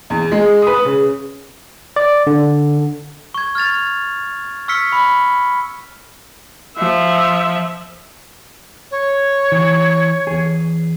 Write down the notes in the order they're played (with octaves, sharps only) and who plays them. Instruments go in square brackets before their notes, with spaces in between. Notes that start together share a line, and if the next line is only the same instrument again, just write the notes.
[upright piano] E2
G#3
B4 D#6
C#3
[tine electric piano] D5
D3
[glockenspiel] C#6 G#6
F6 G#6 A6 F7
C#6 E6 F6 B6 C#7 G7
B5
[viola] F3 E5
[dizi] C#5
[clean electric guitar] E3
E2 G#4